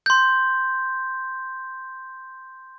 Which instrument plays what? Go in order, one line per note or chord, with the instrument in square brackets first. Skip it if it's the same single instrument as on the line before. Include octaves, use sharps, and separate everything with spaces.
[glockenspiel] C6 G6